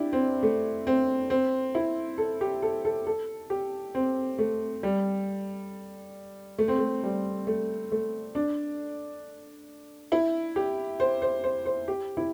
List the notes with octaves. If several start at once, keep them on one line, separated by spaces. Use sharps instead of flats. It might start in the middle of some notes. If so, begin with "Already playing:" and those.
Already playing: D4 E4 G4
C4
A3
C4
C4
E4
A4
G4
A4
A4
A4
G4
C4
A3
G3
A3
C4
A3
G3
A3
A3
D4
E4
G4
C5
C5
C5
C5
G4
E4